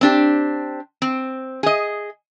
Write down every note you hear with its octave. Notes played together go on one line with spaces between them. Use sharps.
C4 D4 G4
C4
G#4 D#5